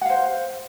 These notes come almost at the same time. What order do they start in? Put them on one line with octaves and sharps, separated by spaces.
F#5 F5 C5